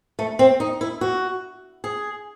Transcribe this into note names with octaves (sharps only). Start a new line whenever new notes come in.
A3
C4
D#4
E4
F#4
G#4